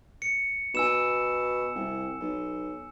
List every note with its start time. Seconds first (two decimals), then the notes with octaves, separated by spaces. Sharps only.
0.22 C#7
0.75 B2 G#5 E6 E7
1.76 C2
2.21 B1